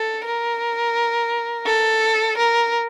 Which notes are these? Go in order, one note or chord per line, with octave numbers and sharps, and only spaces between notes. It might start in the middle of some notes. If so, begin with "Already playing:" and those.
Already playing: A4
A#4
A4
A#4